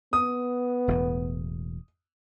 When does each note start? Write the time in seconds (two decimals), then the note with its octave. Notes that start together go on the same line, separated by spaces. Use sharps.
0.13 B3 D#6
0.88 E1 E2 A2